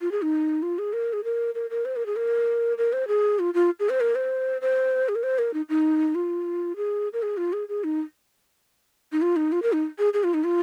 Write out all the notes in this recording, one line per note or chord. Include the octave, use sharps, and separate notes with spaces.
F4
G#4
D#4
F4
G#4
A#4
G#4
A#4
A#4
A#4
C5
A#4
G#4
A#4
A#4
C5
G#4
F4
F4
G#4
C5
A#4
C5
C5
G#4
A#4
C5
A#4
D#4
D#4
F4
G#4
A#4
G#4
F4
G#4
G#4
D#4
D#4
F4
D#4
F4
A#4
D#4
G#4
G#4
F4
D#4
F4